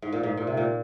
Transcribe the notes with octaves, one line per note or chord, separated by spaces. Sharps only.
G#2
A#2
G#2
A#2
C3
A#2